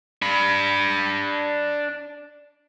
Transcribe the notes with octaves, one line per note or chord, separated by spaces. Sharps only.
D4 B5